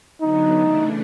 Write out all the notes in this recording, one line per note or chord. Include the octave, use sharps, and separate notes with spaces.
D3 F#3 B3 D#4
C#3 E3 A3 D4